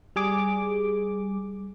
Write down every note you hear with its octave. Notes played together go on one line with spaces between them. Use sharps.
G3 G#4 D6